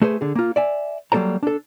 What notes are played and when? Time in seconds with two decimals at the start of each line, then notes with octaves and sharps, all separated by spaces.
0.02 A3 G#4 B4 C5
0.21 D3 G#4
0.35 A#3 F4
0.56 D5 E5 G#5
1.12 F#3 G3 A#3 A4 C5 A#5
1.43 D4 A4